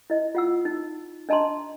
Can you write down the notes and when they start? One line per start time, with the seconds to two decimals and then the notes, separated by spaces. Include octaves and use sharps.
0.10 E4 D#5
0.35 F4 F#5 E6
0.65 D#4
1.29 D4 D#5 A5 A#5 C6